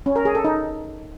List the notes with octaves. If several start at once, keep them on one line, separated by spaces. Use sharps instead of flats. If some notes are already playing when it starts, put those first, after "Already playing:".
C#4
A#4
G#4
A4
D#4